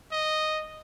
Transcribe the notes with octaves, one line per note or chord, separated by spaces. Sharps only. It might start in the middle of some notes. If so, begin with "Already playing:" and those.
D#5